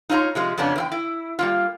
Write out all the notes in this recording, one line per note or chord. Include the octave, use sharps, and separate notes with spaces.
D#4 F4 C#5 F5 A#5
C3 F3 G#3
F2 C#3 B3 C#4 D4
E2 E4 G5
E4
G3 A#3 F4